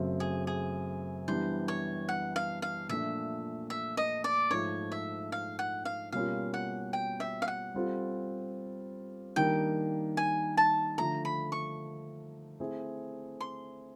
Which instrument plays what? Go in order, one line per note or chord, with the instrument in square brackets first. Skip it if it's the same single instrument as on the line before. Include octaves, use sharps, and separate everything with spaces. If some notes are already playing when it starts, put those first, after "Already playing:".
Already playing: [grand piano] F#2 C#3 F#3 A3 C4
[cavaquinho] G#4
G#4
[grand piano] E3 G3 B3 D4 [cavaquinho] C5
[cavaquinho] C#5
F#5
F5
F5
[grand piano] A#2 F3 A3 D4 [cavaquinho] E5
[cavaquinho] E5
D#5
D5
[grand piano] G#2 F3 A3 [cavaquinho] C#5
[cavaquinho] E5
F5
F#5
F5
[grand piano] B2 G3 A#3 C#4 F4 [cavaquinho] F5
[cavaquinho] F#5
G5
E5
F5
F#5
[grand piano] G3 C4 F4 A4
[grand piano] D#3 G3 A#3 D4 [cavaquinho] G5
[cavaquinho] G#5
A5
[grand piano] D3 F3 A3 [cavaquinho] A#5
[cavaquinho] B5
C#6
[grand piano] A3 C4 E4 G#4
[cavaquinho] C6